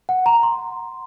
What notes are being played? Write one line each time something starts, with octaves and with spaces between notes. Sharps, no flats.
F#5
A#5
C6